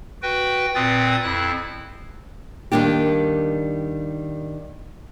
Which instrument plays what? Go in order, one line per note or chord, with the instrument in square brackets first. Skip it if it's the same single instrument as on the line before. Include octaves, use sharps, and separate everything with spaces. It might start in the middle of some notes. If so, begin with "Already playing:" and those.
[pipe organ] F#4 B4 G5
A#2 C4 B4 D#6 A6
F2 E4 F#6
[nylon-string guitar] D#3 G3 A#3 D4 G4